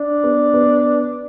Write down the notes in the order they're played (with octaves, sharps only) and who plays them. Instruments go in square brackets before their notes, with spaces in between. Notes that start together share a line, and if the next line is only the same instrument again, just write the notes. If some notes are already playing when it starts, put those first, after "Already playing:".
Already playing: [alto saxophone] D4
[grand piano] B3
B3